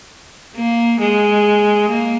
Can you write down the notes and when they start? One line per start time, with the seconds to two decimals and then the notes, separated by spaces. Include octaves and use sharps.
0.56 A#3
0.99 G#3
1.89 A#3